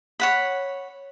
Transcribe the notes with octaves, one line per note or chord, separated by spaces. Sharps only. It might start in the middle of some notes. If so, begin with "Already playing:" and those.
C#5 F#5 B5